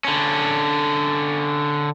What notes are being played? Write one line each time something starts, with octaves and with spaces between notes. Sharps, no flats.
D3 C#4